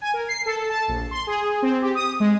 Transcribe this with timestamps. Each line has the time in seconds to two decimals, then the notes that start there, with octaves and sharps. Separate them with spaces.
0.01 G#5
0.14 A#4
0.28 C7
0.46 A4
0.70 A5
0.88 A#1
1.11 C6
1.27 G#4
1.62 C4
1.82 G4
1.95 D#6
2.20 G#3